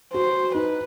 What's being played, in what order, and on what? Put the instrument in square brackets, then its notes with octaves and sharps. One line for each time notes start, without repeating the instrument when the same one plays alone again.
[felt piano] F#4 [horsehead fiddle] C5
[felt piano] D#4 [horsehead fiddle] B4